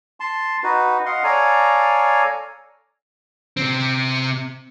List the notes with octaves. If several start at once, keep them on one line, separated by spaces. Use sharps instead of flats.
A5 C6
D#4 F#4 B4
D#5 F5 F#5 C6
A4 C#5 D5 F5 G#5 A#5
C3 C4